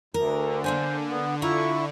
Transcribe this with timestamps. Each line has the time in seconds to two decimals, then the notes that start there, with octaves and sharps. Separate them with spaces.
0.14 D2 D3 A#4
0.64 A#3 D4 C5 G#5
1.10 B3
1.42 E4 F4 A#5 C#6